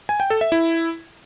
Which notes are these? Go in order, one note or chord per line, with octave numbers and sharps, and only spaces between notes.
G#5
G5
A4
E5
E4